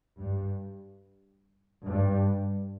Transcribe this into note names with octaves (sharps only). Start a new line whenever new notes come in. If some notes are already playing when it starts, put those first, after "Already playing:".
G2
G2